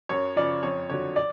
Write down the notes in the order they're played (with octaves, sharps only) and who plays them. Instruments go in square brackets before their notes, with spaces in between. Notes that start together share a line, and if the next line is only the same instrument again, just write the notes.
[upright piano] F#2 C#5
C#3 F3 D5
F2 C#5
D3 F#3 C#5
D5